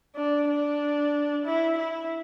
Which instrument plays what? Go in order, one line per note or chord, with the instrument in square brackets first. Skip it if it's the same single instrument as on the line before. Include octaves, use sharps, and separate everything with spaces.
[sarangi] D4
D4
E4
E4